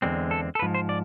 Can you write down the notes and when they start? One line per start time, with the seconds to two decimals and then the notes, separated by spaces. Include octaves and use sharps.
0.02 E2 D3 G#3 C4
0.31 A4
0.55 A4
0.59 B4
0.62 G#2 F3
0.74 C5
0.89 D5